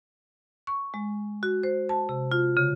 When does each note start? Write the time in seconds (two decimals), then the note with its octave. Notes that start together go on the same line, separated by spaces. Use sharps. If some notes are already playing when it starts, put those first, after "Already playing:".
0.67 C#6
0.94 G#3
1.43 F#4
1.63 C5
1.89 A5
2.09 C3
2.32 F4
2.57 C#3